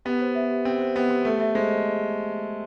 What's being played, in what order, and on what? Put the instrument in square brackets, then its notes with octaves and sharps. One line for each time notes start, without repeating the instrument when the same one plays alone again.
[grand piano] B3 [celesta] G4
[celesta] C5
E5
G4
[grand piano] C4 [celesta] G4
[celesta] C5
[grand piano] B3 [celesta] G4
[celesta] G4
[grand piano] A3 [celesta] E5
[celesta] E5
[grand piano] G#3 [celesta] C5